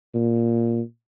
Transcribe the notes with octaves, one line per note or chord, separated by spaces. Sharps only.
A#2